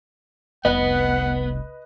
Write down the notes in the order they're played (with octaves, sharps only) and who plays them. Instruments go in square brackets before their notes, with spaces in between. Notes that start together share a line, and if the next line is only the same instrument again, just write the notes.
[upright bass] F1 C2 [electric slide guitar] B3 [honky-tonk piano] B4 D#5 [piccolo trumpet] F#5